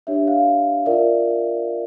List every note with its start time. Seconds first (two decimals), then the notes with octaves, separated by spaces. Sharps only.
0.07 D4 G4 C#5 E5
0.27 F5
0.86 F4 A#4 D5 E5